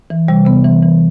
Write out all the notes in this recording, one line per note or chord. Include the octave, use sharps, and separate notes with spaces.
E3
C3 G3
C3 B3
E3
E3